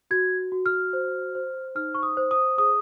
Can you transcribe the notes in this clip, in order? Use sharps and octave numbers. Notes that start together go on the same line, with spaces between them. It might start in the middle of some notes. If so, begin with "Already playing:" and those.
F#4 G#6
F#4
F6
C5
C5
D#4 F6
C#6
D#6
C5
D#6
G#4 D#6